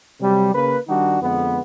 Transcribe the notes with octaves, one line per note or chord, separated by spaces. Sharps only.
C3 F#3 G3
C#3 A#3 B4
D#3 G3 D4 D#4 F#4
F2 D3 G#3 B3